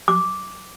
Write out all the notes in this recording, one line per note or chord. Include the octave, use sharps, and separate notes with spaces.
D6